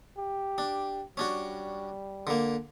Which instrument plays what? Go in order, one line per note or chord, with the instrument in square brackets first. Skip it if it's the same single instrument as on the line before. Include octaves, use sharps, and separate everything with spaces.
[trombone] G4
[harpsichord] D4
[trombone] G3 [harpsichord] C#4 D4 F#4
[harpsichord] D3 A#3